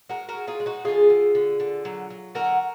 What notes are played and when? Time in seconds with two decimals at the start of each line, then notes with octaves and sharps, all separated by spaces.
0.09 G#3 F#4 A#4
0.29 F#4 A#4
0.35 G#3
0.47 F4 G#4
0.60 G#3
0.66 D#4 F#4
0.85 D3 F4 G#4
1.10 D3
1.35 D3
1.60 D3
1.85 F#3
2.10 F#3
2.35 D3 F#4 A#4